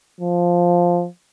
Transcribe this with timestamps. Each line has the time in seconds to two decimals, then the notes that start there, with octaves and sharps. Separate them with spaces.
0.21 F3